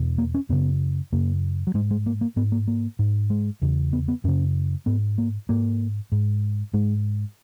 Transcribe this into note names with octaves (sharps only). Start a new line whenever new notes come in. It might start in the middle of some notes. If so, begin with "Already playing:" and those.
Already playing: E2 B2
A#3
C#4
F#2 C#3 B3
F#2 C#3 A#3
F#3
G#2 G#3
G#3
A#3
A#3
G#2 B3
A#3
A#3
G#2
G#3
E2 C#3
B3
B3
F#2 C#3 C#4
G#2 B3
A#3
G#2 A#3
G#2
G#2 G#3